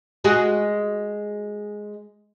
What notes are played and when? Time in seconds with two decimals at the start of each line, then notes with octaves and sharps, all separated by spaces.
0.24 G#3 F#4 G#4